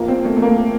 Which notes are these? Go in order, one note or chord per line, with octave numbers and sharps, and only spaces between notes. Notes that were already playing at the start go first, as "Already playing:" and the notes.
Already playing: A#1 A#2 F3 A#3
C4
A3
A3
A#3